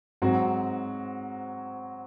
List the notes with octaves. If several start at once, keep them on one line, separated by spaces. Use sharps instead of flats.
G#2 F#3 C4 F#4